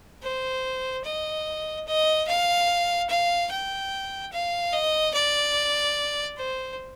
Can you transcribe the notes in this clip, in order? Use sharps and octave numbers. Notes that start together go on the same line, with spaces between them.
C5
D#5
D#5
F5
F5
G5
F5
D#5
D5
C5